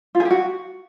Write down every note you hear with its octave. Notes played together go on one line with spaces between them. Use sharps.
F4
G#4
G4
F#4